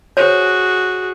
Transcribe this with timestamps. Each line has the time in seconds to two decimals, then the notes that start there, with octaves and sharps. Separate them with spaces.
0.17 F#4 G#4 C5 C#5